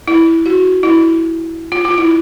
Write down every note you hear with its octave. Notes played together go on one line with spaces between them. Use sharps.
E4
F#4
E4
F4
F4
E4